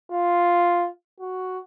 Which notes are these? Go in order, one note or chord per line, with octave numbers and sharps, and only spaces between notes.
F4
F#4